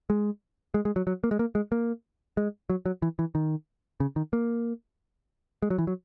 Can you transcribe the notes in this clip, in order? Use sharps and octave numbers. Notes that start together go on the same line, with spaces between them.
G#3
G#3
G#3
F#3
F#3
A#3
G#3
A#3
G#3
A#3
G#3
F#3
F#3
E3
E3
D#3
C#3
D#3
A#3
G#3
F#3
E3
F#3